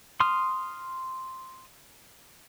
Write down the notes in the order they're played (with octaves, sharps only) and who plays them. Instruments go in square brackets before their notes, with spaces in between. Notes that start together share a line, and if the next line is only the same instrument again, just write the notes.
[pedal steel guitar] C6 D#6 F6